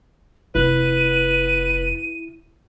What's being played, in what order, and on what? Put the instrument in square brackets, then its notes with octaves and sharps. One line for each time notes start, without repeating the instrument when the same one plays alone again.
[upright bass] F1 [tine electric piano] E4 [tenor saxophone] B4 [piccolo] D#7